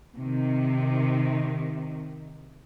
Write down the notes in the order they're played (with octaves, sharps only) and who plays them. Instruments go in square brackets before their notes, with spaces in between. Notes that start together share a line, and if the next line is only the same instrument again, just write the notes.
[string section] C3 D#3